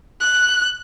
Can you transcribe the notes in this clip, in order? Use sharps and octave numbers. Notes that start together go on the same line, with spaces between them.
F#6